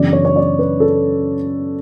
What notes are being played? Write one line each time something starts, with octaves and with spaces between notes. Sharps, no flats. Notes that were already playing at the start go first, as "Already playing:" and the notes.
Already playing: F#2 C#3 E3 B3 D4 D5
C#5
C#5
D5
B4
A4